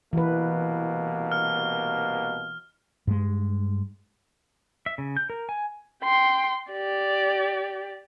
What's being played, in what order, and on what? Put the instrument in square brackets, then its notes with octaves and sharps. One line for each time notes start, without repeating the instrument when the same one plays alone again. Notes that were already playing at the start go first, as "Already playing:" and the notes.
[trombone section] C2 B2 A#3 [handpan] E3 B4
[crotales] F6
[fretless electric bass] G2 G#3
[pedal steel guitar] E5
C#3
G6
A#4
G#5
[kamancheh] G5 C6
G4 D5